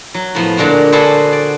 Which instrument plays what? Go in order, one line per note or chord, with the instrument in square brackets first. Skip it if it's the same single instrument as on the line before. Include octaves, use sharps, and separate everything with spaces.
[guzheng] F#3
A2 F3 B3
A#2 D3 G#3 D4 F#4
D4 F#4 G#4 A4 B4 C5
D5